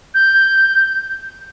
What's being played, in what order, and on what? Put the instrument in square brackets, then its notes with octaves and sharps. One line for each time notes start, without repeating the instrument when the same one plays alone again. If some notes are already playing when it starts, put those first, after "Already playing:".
[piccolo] G6